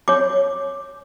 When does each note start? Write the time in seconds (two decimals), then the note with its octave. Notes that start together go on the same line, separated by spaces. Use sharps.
0.08 C#5 D6